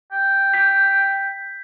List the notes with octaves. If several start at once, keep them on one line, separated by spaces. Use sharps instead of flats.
G5
G6 B6